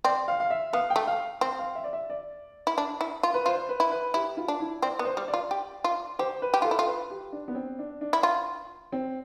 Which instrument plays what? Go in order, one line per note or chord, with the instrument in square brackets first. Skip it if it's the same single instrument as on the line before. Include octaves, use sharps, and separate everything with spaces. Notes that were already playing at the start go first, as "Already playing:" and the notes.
[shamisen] C4 [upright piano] D5
[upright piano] F5
F5
E5
[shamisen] B3 [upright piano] F5
[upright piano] G5
[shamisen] A3
[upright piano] F5
[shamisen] C4 [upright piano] G5
[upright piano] F5
E5
D5
E5
D5
[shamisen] E4
D4
E4
F4
[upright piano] B4
[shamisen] F4 [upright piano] C5
[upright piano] B4
[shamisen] E4
[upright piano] B4
[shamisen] E4 [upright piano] G4
[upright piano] F4
[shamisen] D4
[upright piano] E4
[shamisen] C4 [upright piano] D5
[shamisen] B3
[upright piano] C5
[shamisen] G3
[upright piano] D5
[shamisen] F4
G4
F4
[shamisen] G4 [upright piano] C5
[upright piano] B4
[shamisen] G4
[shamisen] F4 [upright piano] A4
[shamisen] E4
F4
[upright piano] B4
G4
D4
B3
C4
D4
D4
[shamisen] E4
F4
[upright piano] C4